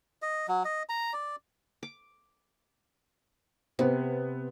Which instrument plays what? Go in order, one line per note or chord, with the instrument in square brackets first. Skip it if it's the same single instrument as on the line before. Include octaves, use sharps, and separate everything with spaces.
[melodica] D#5
F#3
D#5
A#5
D5
[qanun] D6
[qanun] C3 [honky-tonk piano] B3 C4